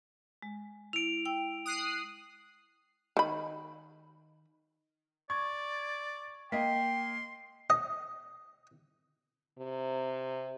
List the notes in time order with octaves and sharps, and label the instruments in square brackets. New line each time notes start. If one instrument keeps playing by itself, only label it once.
[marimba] G#3
[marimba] E4 [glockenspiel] D7 F7
[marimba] G5 E6
[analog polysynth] D#6 F#6 C7
[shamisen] D#3 B5
[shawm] D5 [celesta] C#6 [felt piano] G#6
[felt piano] A#3 D#5 [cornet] G5 [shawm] C6 [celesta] B6
[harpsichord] D#5
[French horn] C3